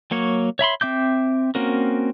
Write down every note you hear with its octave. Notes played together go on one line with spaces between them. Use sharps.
F#3 A#3 C#5
C#5 E5 B5 C6
C4 E5 D6 G6
A#3 C4 C#4 F#4 A#4